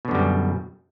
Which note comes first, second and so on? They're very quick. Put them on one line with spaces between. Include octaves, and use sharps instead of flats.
B2 D3 F#2 G3